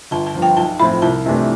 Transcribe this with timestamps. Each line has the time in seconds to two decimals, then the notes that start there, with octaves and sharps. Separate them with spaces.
0.11 G1 A5
0.27 A5
0.35 G2 F3
0.42 G5
0.57 B1 A5
0.79 A2 F3 C4 E4 B5
1.02 C2 A5
1.26 C3 E3 A3 D4